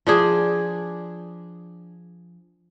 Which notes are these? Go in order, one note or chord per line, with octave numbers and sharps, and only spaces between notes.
F3 D4 G#4